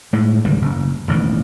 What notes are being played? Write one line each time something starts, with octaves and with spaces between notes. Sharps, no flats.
A2 G#3
G#1 C#2 D3 G3
F#1
E1 A1 D#3